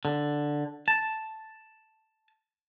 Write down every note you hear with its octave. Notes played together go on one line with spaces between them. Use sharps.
D3
A5